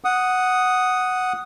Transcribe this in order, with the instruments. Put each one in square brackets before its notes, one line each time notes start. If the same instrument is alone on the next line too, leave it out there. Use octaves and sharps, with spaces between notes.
[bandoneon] F#5 D#6